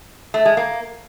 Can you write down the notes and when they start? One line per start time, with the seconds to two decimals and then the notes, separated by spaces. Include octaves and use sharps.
0.34 A3
0.45 G#3
0.57 A#3